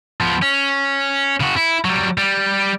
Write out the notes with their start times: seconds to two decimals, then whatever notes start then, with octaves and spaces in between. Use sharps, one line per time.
0.21 F3 B3
0.42 C#4
1.40 C#3 F#4
1.56 E4
1.85 F#3 G3
2.18 G3